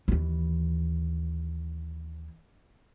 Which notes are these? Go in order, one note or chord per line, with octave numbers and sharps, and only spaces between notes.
D#2 E3